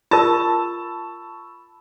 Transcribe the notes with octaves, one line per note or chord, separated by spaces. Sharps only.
F4 A#4 A5 B5 C#6 E6